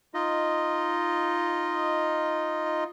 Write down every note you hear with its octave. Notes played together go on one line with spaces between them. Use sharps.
D#4 F4 D#5